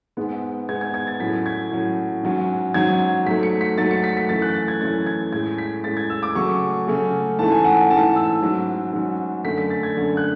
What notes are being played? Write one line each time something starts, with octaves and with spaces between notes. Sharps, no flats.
G#2 G#3 B3
G#2 G#3 B3 G#6
G#6
G#6
A6
A2 F#3 C#4 B6
G#6
A2 F#3 C#4
G#2 F#3 C#4
G#2 F#3 C#4 G#6
G#2 F#3 A3 B6
C#7
B6
G#2 F#3 A3 A6
C#7
B6
B6
F#2 E3 A3 C#4 A6
F#6
A6
G#6
F#2 E3 A3 C#4 A6
G#6
A2 G#3 C#4 G#6
B6
A2 G#3 C#4 A6
G#6
E6
D6
C#3 F#3 A3 C#4 C#6
C#3 F#3 A3 C#4
G#2 E3 A3 C#4 A5
G#5
F#5
G#2 E3 A3 C#4 A5
E6
G#2 F#3 C#4
G#2 F#3 C#4
F#2 D3 A3 C#4 B6
B6
A6
G#6
F#2 D3 A3 C#4
F#6